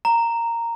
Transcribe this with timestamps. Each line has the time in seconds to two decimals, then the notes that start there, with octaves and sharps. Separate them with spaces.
0.05 A#5